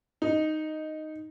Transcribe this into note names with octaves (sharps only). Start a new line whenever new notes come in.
D#4